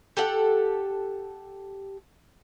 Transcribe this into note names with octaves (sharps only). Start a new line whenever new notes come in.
G4 A4 F#5